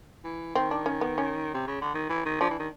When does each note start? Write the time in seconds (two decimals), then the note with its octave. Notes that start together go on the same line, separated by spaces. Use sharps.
0.24 E3
0.55 D#3 C4
0.71 D4
0.86 C#4
1.01 B3
1.18 C#4
1.54 C3
1.67 C#3
1.81 D3
1.94 D#3
2.09 E3
2.25 D#3
2.41 F3 D4
2.50 E3
2.59 D#3